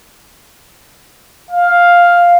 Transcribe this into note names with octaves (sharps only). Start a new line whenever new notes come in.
F5